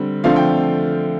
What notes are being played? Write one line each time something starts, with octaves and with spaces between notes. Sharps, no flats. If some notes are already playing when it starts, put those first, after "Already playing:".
Already playing: D3 G3 C4
D3 F3 A3 C4 F5
G5